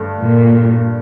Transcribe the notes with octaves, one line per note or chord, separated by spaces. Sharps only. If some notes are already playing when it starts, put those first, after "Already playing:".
Already playing: G2 D3 A3
A#2